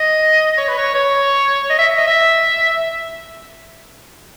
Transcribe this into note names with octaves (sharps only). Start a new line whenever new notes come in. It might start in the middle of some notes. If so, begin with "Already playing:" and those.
Already playing: D#5
C#5
B4
C#5
C#5
D#5
E5
D#5
E5